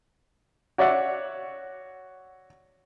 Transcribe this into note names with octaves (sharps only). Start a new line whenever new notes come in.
F#4 C#5 D5 E5 F#5